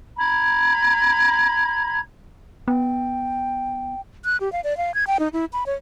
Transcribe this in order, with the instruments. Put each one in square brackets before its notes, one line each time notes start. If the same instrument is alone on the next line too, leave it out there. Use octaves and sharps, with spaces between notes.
[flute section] A#5 B5 G#6
[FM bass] B3 [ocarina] G5
[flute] F#6
G4
F5
D5
F5
G#6
G5
D#4
E4
B5
C#5